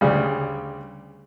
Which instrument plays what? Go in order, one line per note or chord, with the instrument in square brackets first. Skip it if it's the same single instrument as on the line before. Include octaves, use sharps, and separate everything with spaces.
[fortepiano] D2 C#3 G3